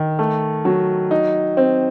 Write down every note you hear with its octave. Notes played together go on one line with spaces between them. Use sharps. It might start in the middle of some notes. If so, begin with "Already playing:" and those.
Already playing: D#3
A3
F#3
D#4
C4